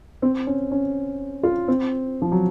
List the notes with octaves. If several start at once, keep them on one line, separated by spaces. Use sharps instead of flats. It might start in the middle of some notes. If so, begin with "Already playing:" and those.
C4
C#4
C#4
F4
C4
F3
F#3